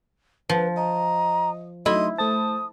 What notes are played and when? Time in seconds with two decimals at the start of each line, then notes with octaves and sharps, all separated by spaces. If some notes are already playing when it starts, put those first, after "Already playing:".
0.49 F3 B4
0.77 D#5 A#5
1.86 F#3 A3 D#4 E4 D#5 C6
2.18 A3 C5 A5 D#6